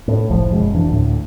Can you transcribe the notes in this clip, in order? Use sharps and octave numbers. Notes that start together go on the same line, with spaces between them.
A2
F#1 C2 A2 F3
F#1 F#2 B2 G#3
F2 E3 D4
D2 A2